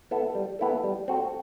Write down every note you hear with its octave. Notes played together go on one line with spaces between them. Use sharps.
B3 E4 A4
G3
B3 E4 A4
G3
C4 F#4 A4